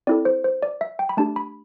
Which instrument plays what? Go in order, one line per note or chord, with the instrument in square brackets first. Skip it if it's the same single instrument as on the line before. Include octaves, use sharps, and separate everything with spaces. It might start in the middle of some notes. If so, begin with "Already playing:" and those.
[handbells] C4 E4 A4 D5
C5
C5
D5
E5
G5
B5
A3 D4 G4 A5
B5